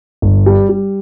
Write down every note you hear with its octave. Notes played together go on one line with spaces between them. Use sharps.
G1
G3
G3